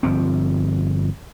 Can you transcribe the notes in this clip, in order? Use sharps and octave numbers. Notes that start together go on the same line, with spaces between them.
G1 F3 C4